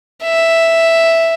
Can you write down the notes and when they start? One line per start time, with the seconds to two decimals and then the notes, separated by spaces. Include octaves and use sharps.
0.24 E5